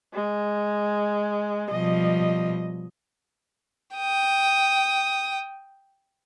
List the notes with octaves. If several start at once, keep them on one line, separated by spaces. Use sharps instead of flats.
G#3
B2 F3 G3 D#5
G5 D#6